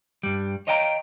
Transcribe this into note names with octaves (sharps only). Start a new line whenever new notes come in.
G2 G3
C#5 D#5 F5 G5 G#5 A#5